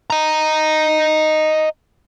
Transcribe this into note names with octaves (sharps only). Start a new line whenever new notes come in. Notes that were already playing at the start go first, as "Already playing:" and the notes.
D#5 A#5